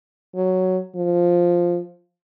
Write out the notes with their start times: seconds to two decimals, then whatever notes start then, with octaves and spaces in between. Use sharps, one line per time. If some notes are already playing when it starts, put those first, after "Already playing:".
0.36 F#3
0.96 F3